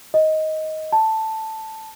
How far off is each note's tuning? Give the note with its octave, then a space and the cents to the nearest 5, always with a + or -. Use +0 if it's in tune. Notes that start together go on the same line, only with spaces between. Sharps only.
D#5 +10
A5 +5